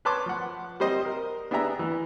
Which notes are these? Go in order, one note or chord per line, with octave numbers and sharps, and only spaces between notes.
B4 C#5 A5 C6 D6
F3 F#5
G3 C4 C5 D#5
A#4
B3 D4 G4 G#4 E5 A#5
E3